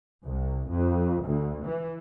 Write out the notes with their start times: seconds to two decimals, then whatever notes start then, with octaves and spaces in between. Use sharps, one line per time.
0.25 C2
0.71 F2
1.24 D2
1.66 E3